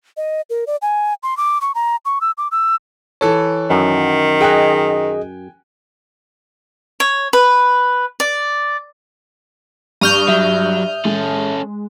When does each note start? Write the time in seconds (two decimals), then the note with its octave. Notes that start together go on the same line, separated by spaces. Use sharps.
0.17 D#5
0.50 A#4
0.67 D5
0.82 G#5
1.23 C6
1.37 D6
1.61 C#6
1.75 A#5
2.05 C#6
2.21 E6
2.38 D6
2.51 E6
3.21 E3 A4 C#5 A5
3.70 F#2 D#3
4.41 G#4 D#5 G5 G#5 F#6
7.00 C#5
7.33 B4
8.20 D5
10.01 G2 C#6 D#6 F6 G6
10.28 F#3 E5
11.05 G#3 C#4 A4